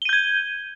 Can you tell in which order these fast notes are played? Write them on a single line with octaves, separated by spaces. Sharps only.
G7 D#7 G6 G#6